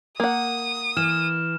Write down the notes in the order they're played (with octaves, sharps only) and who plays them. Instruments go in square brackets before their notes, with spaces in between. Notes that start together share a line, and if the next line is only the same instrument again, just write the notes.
[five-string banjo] A#3 F#5 [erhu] D#6
[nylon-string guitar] E3 [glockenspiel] F6 E7